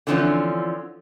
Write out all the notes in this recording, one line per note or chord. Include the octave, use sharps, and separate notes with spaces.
D3 E3 F3 C4 C#4